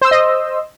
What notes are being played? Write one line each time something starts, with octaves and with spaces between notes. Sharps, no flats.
C5 D#5 C6 E6